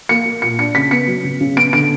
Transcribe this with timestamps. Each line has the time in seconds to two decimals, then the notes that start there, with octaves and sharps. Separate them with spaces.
0.09 A#3 C#7
0.26 A#3
0.42 A#2 C#7
0.59 D4 C#7
0.75 C#3 B6
0.91 B3 C#7
1.07 F#3
1.24 C#3
1.41 C#3
1.56 B3 D7
1.73 D3 D7